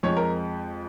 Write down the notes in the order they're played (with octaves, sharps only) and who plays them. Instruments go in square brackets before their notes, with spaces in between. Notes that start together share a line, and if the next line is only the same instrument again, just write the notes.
[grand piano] F2 F3 G#3 C#5
A#4